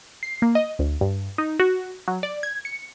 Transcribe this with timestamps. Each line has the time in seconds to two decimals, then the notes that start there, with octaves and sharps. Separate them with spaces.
0.23 C7
0.42 A#3
0.55 D#5
0.79 D2
1.01 G2
1.38 D#4
1.60 F#4
2.08 F#3
2.23 D5
2.43 G#6
2.65 C#7